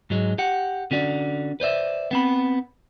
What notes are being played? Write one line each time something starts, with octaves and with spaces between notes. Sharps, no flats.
G#2 F#3 G#3
G4 F#5
D3 C#4 F#4 D5
B4 C5 D5 E5
B3 C4 B5